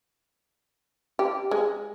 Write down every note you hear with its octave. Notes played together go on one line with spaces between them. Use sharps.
G4
G#3